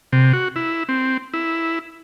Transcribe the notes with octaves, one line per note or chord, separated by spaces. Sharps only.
C3
F#4
E4
C4
E4